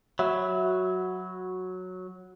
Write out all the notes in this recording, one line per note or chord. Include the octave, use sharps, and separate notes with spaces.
F#3 F#4 E5 B5 E6